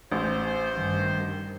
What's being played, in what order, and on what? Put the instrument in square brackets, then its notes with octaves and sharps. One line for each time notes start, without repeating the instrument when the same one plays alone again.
[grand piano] A1 [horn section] C5
[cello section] G2 D#3